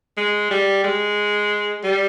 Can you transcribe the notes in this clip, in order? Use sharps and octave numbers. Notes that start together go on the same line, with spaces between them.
G#3
G3
G#3
G3